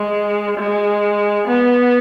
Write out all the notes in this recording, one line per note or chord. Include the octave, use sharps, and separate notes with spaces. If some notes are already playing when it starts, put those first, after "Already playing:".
Already playing: G#3
G#3
B3